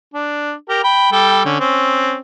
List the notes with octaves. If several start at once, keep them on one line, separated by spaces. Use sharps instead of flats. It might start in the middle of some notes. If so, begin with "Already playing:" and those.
D4
G4 A#4
G5 B5
G3 A4 G5
D3 C#4
C4 C#4